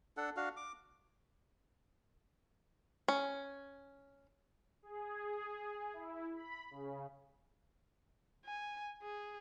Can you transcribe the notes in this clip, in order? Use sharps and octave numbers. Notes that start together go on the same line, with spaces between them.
D4 A4 F#5
D4 F#4 F5
D6
C#4
G#4
E4
B5
C#3
G#5
G#4